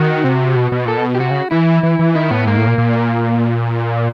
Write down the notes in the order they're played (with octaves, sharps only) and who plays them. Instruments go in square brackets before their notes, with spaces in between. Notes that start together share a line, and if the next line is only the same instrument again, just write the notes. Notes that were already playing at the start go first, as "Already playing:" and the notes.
Already playing: [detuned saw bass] D#3 [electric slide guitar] F#4
[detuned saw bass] C3
B2
B2
[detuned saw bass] A#2 [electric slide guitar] A4
[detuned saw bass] B2
[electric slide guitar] G4
[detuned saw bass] C3 [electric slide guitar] F#4
[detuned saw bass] C#3
[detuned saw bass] E3 [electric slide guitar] E4
[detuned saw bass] E3
E3
[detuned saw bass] D#3 [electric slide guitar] E4
[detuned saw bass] A2 [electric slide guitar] B3
[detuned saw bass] G#2 [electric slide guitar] A#3
[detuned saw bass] A2
A#2
A#2